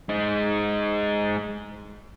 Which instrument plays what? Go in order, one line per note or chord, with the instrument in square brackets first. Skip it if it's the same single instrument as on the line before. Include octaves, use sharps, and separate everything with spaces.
[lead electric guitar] G#3 D#4